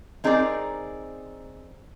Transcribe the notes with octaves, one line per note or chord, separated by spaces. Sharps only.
C4 D#4 G#4 A#4 C#5 D5